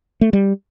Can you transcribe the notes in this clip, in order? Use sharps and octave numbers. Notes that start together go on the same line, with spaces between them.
A3
G3